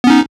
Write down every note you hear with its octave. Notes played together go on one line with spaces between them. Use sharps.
B3 C#4 D#4